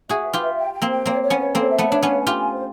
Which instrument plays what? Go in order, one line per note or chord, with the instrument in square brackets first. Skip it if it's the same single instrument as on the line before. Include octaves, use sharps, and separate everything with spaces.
[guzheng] F#4 G#4 [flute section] E5
[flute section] B4
[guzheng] F4 G4
[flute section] E5
G5
G5
[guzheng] A#3 C4
[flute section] G5
[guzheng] A#3 C4 [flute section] C#5
[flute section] C#5
[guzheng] B3 C#4
[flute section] C#5
[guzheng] A#3 C4 [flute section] A4
[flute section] E5
[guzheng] A3 B3
[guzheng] D4 [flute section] C#5
[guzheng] B3 C#4 [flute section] F5
[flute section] G#5
[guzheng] F4 G4
[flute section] G#5
C5